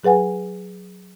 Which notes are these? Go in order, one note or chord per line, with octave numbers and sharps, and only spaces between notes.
F#3 G#4 B4 F#5 G#5